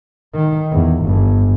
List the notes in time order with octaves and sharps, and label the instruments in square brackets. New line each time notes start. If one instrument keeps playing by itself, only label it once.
[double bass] D#3
E2
G1